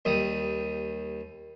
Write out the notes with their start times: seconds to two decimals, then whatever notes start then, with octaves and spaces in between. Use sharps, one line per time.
0.05 D#2 D#3 G3 D#6